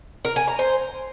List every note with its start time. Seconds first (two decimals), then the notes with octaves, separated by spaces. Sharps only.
0.25 A#4
0.36 G#5
0.47 A#5
0.59 C5